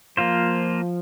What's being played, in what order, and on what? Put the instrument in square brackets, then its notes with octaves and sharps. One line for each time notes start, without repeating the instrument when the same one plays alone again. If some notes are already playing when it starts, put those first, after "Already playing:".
[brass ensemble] F3 [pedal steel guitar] A#3 F4 C5